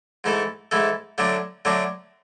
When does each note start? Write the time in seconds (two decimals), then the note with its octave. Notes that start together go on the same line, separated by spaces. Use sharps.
0.24 G#2 E3 A3 E4 A4
0.71 G#2 E3 A3 E4 A4
1.18 D3 F#3 A3 D4 F#4
1.65 D3 F#3 A3 D4 F#4